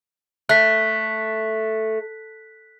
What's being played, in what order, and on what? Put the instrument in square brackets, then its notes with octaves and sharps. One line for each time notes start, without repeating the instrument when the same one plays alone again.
[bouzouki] A3 [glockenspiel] F#6 B6